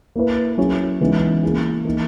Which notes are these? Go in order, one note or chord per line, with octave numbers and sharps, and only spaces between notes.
A#3 E4 B4
F#3 C#4 E4 G#4 C#5
C#3 E3 G#3 B3 D#4
A#3 E4 G#4
E3 A#3 D#4